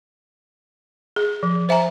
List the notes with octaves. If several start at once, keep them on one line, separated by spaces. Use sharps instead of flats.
G#4
F3
C5 E5 G#5 A#5